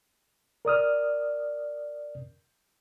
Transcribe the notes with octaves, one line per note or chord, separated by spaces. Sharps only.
A#4 D5 D#6 F6